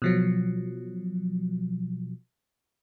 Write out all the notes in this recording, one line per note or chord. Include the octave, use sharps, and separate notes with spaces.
B2 F3 F#3